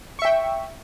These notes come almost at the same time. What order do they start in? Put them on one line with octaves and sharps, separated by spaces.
C#6 E5 G5